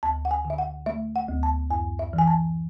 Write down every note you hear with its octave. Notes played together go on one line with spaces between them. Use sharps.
D2 A5
F#5
G#5
D3
E5
F#5
A3 E5
F#5
D2
A5
F#2 G#5
E5
E3
G#5
A5